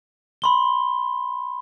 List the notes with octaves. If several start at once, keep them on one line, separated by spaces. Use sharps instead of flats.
B5 C6 G7